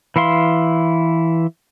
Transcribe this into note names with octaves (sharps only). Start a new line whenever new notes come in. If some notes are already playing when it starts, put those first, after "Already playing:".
E3 E4 F5 C6